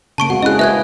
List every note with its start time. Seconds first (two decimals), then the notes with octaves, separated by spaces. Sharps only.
0.18 C#3 A#3 A5 C#6 D7
0.30 G#3 C4 F#4 F#5
0.43 C#4 E4 G#4 D#5 F#6
0.59 A#3 E4 B4 E5 F#6 G#6